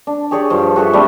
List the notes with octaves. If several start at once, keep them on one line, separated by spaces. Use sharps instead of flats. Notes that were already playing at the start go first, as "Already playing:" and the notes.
D4
G4 G#4 C#5 D5
G2 F3
F#4 G#4 A4 E5
G3 A3 C4 D4